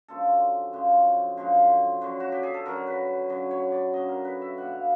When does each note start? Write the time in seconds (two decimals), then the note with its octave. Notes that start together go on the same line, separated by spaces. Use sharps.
0.08 F#2 D3 F3 G#3 A4
0.73 F#2 D3 F3 G#3
1.37 F#2 D3 F3 G#3
2.01 F#2 D3 F#3
2.20 F#4
2.32 G4
2.43 G#4
2.54 A4
2.66 F#2 D3 F#3 A#4
2.87 B4
3.29 F#2 D3 F#3
3.51 C#5
3.72 D5
3.93 F#2 D3 F#3 D#5
4.09 A#4
4.25 B4
4.41 E5
4.58 B2 G3 F#5
4.73 F5